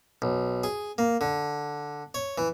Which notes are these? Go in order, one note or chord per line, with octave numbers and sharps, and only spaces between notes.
B1
G#4
A#3
D3
C#5
E3